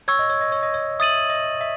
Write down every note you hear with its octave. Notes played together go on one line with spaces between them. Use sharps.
C#5 C#6 E6 G#6
D#5
C#5
D#5
C#5
D#5
C#5
E5 D#6 A6 D#7 F#7
D#5
E5